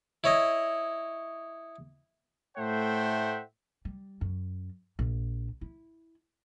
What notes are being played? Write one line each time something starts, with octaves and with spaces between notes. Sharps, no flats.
E4 C#5 D#5
A2 A3 C5 E5 F#5 G5
G3
F#2
A#1
E4